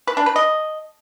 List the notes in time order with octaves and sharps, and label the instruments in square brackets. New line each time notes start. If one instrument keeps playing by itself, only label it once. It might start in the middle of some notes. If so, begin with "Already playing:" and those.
[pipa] B4
D4
B4
D#5